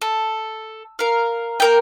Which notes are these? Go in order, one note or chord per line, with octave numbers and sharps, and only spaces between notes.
A4
A#4 F5
A#3 A#4 G5